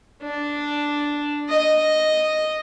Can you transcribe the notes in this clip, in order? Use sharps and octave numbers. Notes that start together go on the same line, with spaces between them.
D4
D#5